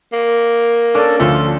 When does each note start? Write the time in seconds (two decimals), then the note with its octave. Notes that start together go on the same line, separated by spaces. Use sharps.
0.13 A#3
0.95 C#4 D4 A4
1.20 D2 F3 F4 A4